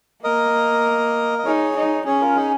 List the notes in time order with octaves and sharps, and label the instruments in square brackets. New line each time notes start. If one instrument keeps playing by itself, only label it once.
[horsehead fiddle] A#3 [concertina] A#4 D#5
[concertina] D#5
[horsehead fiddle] D#4 [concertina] G#4 C#5
[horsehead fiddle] D#4
[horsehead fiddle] C#4 [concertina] G#4 C#5
[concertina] F4 A#4
D#4 G#4